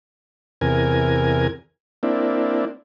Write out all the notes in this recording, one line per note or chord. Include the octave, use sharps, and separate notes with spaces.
E2 C3 A#4 G#5
A#3 C4 D4 E4